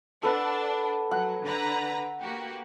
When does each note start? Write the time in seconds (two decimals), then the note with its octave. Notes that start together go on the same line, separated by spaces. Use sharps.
0.23 D4 A4 B4 F#5
1.11 F#3 F#5
1.44 D3 B4 A#5
2.20 A#3 F#4 G4